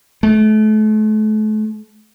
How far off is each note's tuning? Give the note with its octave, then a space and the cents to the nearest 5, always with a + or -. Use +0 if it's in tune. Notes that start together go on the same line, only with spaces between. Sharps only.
A3 -35